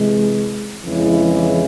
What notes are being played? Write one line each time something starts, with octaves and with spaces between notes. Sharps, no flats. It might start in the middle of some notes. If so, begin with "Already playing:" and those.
Already playing: C3 E3 G#3
F2 C#3 E3 G#3 E4